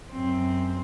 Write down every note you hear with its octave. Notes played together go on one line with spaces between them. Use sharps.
F#2 C4